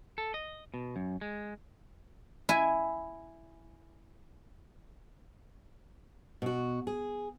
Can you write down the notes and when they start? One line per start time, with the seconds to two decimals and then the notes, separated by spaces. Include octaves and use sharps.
0.18 A4
0.34 D#5
0.74 B2
0.96 F#2
1.21 G#3
2.49 E4 G#5
6.42 B2 F#4
6.87 G#4